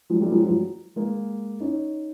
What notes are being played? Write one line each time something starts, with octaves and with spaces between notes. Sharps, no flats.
F#3 G#3
G3 A3
F#3 G#3
F3 G3
F#3 G#3
G#3 A#3
C#4 D#4